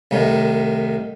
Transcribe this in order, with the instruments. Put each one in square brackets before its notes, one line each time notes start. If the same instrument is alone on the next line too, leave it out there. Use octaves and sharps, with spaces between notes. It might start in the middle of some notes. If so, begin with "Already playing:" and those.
[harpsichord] C2 A2 D#3